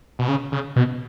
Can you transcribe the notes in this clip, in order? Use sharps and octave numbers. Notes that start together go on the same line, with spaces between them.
B2
C#3
C#3
B2